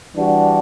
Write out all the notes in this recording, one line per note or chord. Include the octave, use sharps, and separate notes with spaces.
E3 G3 D4 F#4